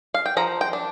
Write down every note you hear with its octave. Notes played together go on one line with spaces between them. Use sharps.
F5
G5
F3 A#5
G5
D4